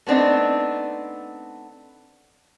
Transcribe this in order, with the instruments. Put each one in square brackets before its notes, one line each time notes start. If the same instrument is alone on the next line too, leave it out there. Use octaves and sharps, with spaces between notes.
[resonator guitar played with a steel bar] A3 B3 C4 D4 D#4